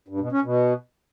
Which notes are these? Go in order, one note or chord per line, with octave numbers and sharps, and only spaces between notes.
G2
B2
C#4
B2